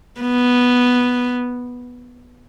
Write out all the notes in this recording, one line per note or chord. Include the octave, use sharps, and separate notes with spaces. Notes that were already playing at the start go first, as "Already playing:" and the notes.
B3